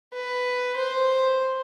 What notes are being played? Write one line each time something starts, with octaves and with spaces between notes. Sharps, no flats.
B4
C5